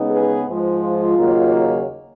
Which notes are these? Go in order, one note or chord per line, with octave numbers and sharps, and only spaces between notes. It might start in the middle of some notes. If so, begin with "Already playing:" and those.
Already playing: C#3 G#3 B3 D#4
G#4 B4
G#2 F3 G#3
F4
D#2 C#3 F#3 A#3 D#4